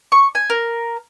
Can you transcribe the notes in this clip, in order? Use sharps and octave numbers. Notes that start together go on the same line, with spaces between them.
C#6
G#5
A#4